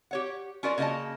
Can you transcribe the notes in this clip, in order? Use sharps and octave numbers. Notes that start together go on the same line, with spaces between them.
G4 C#5 F#5
C#4 F4 F#4 A#4 D5
C#3 A#3 E4 D#5 A5